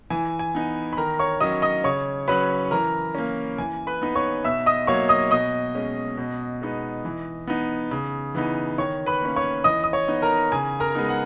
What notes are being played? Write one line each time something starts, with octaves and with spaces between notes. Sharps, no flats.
E3 G#5
G#5
B3 D#4
B5
D#3 A#4 A#5
C#5 C#6
F#3 C#4 D#5 D#6
D#5 D#6
C#3 C#5 C#6
F#3 C#4 B4 B5
E3 A#4 A#5
A#3 C#4
E3 G#5
B4 B5
B3 D#4
C#5 C#6
B2 E5 E6
D#5 D#6
F#3 A#3 C#5 C#6
D#5 D#6
B2 D#5 D#6
G#3 C#4
B2
G#3 B3 D#4
E3
B3 D#4
C#3
E3 B3 D#4
D#3 C#5 C#6
B4 B5
A#3 C#4
C#5 C#6
E3 D#5 D#6
D#6
C#5 C#6
B3 D#4
A#4 A#5
C#3 G#5
A#4 A#5
G#3 B3 D#4
F#5